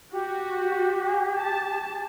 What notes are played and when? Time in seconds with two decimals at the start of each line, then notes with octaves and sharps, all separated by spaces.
0.12 F#4 G4
1.38 A5